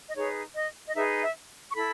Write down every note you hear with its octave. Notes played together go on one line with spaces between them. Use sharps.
D#5
D#4 G#4 B4 C#5
D#5
D#5
D#4 G#4 B4 E5
E5
C#6
E4 A4 B5